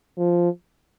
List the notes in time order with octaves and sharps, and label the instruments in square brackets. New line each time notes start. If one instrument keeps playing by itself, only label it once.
[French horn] F3